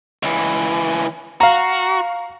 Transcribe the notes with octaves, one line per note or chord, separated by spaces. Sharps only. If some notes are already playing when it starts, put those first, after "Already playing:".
C#2 E3
F#4 F5 A#5